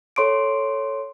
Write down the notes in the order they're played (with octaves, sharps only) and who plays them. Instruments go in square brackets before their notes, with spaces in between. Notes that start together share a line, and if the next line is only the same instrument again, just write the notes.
[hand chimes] A4 C#5 C6 D6 D7